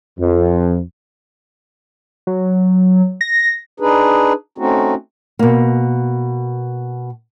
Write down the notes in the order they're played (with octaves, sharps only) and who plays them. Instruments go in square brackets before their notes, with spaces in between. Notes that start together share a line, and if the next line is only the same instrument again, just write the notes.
[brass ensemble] F2
[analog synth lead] F#3
A#6
[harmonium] D4 D#4 G#4 B4
A3 C4 C#4 D#4 F#4
[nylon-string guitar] B2 A#3